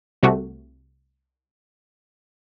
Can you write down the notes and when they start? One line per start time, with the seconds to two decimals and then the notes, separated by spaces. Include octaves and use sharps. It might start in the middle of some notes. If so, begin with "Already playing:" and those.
0.23 C2 C3 A3 F#4